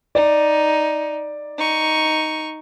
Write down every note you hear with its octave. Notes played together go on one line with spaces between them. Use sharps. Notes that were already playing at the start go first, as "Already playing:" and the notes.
D#4 D5
D#4 C#6